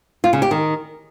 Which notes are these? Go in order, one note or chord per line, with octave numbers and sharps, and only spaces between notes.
F4
C#3
G4
D#3